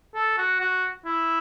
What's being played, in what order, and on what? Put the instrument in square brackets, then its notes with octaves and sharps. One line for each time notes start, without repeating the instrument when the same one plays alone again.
[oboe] A4
F#4
F#4
E4